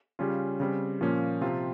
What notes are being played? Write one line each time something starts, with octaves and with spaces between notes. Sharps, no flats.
C#3 G3 C#4 F4
C#3 G3 C4
A#2 F3 A#3 C#4
C3 F3 C4 F4